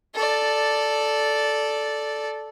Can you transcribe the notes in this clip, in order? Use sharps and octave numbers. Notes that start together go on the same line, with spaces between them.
A4 D5